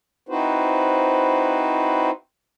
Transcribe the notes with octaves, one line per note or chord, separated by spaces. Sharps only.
C4 D#4 E4 F#4 B4 C5